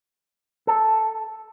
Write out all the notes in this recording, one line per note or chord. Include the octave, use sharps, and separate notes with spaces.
A4